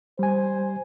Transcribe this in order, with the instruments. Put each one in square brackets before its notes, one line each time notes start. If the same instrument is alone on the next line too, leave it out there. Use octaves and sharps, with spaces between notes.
[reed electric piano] G3 G#5 [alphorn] C5